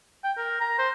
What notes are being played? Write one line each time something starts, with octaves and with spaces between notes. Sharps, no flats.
G5
A#4
A#5
C5